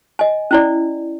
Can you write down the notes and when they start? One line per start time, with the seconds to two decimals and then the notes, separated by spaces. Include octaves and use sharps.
0.19 D#5 G#5
0.51 C#4 E4 D5